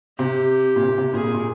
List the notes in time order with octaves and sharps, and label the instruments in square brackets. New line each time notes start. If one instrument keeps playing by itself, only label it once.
[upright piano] C3 [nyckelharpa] G4
[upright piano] A#2
C3
C3
[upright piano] A#2 [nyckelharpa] G#4
[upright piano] A#2
A#2